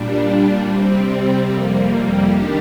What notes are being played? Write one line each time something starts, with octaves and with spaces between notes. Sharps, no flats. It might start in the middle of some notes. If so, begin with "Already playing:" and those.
Already playing: A#2 G3 D4
C3 G3 C4
F2 C3 G3 A#3
D#3 G3 D4 G4